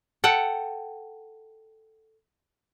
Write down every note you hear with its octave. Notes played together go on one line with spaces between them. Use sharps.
A4 F#5 G5